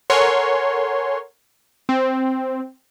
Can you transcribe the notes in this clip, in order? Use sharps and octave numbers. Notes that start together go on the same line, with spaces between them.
A4 A#4 C#5 F#5 G#5 C6
C4